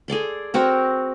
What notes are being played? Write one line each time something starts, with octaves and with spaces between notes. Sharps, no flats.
G#4 A4 D5 C6
C4 F#4 A#4